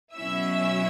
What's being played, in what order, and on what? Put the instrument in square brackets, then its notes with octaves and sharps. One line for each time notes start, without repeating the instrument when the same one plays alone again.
[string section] B2 F#3 C#4 E4 E5 E6